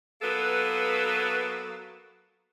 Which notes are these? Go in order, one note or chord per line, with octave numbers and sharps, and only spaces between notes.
F#3 A#3 B3 A4 B4